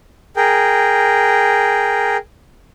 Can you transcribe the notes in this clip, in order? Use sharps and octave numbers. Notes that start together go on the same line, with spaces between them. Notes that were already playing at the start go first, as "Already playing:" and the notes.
G#4 A#4 G5